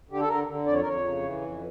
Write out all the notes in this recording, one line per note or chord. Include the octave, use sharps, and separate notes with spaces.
D3 G4
A4
D3 A#4
D3
F2 D5
C#5
A#4
F2 C#5
C#3
E3
F2